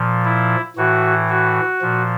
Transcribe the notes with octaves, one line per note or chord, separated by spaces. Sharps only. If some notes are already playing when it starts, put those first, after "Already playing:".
Already playing: A#2 F3
E4
A2 E3 F#4
F#4
A#2 F3